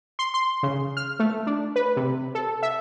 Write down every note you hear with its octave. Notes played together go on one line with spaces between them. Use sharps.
C6
C6
C#3
F6
A3
D4
B4
C3
A4
E5